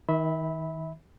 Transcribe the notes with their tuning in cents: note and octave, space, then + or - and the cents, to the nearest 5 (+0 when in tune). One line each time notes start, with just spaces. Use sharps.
D#3 +30 E5 -25 B5 +0